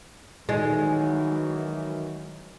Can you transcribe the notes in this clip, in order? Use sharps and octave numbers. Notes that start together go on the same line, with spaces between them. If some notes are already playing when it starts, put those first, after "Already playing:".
D#3 E3 F#3 G#3